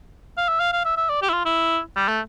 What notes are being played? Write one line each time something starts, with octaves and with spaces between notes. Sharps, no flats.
F5
E5
F5
F5
E5
E5
D5
G4
E4
F4
E4
G3
A3